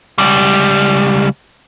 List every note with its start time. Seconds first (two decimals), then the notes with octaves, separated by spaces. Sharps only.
0.18 C#2 G3